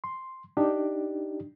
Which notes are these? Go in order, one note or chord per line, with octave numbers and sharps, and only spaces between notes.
C6
D4 D#4 G4